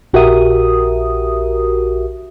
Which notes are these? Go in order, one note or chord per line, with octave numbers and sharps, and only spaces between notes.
A#1 F#4 G4 A#4 E5 D#6